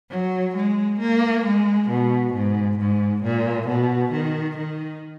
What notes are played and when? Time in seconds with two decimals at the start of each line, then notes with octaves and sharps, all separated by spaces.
0.10 F#3
0.55 G#3
1.00 A#3
1.44 G#3
1.89 B2
2.34 G#2
2.78 G#2
3.23 A#2
3.68 B2
4.12 D#3
4.57 D#3